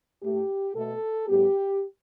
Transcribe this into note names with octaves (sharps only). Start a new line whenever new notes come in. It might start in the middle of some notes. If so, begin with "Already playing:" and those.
A2 A3 G4
B2 A3 A4
A2 G3 B3 G4